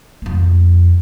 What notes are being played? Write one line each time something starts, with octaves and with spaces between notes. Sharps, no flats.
F2 A#3